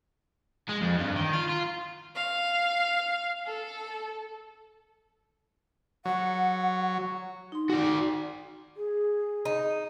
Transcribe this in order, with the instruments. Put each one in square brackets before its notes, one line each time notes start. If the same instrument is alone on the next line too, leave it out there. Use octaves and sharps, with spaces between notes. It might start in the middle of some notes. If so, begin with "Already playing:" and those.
[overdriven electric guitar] G#3
F2
G2
D#3
F4
F4
[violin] F5
A4
[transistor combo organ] F#3 [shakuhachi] F#5
[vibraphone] D#4 C6
[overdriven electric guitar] F#4 D5
[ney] G#4
[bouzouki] D#4